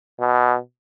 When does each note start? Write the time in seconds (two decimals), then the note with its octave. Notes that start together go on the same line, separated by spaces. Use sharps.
0.20 B2